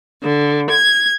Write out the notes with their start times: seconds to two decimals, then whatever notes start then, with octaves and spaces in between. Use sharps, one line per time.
0.23 D3
0.69 G#6